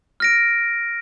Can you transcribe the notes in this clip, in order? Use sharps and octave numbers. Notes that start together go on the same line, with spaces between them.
F6 A#6 D7